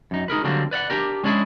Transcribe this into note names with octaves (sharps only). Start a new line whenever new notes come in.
F#2 D#4
D#4 G#4 A#4 B4
D3 F#3 G3 A#3 C4
B4 D5 F5 F#5
D4 G4 A#4
G#3 C#4 D4 E4 G4 G#4